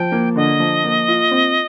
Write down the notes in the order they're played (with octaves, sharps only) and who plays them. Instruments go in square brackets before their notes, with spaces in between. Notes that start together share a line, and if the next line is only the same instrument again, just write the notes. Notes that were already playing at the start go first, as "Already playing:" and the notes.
Already playing: [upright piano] F3 [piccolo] G5
[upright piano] A#3
[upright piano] D3 [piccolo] D#5
[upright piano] F3
A#3
F4
C4